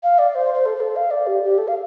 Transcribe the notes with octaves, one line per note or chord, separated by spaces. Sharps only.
F5
D5
C5
C5
A4
C5
A4
F5
D5
G4
G4
A4
F5